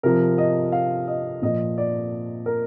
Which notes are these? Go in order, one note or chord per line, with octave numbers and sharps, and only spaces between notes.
C3 F3 A#4
D#5
F5
D#5
A#2 F3 D#5
D5
A#4